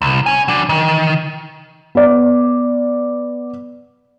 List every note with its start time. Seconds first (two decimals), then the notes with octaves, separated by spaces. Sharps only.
0.02 C2
0.26 C#4 G#5
0.48 F#3 D4
0.69 D#3
1.95 B3 D5